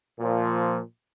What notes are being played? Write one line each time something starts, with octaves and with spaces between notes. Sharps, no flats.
A#2 F3